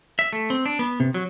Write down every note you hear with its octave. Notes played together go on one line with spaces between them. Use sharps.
E5
A3
C4
D4
B3
C3
F#3